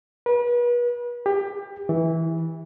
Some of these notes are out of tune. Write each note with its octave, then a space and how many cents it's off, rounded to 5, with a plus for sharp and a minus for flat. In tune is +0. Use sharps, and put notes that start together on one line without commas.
B4 -35
G4 +25
E3 -15